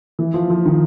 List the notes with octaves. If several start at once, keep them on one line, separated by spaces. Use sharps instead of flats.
E3
F3
F3
D#3